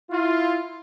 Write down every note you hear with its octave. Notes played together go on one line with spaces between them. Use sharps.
E4 F4